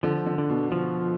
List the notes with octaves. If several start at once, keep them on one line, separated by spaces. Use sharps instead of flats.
D3 F3
D3
D3
B2
F3